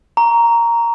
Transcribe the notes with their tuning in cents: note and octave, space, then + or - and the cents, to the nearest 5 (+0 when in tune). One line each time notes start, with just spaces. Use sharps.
A#5 +0 C#6 +30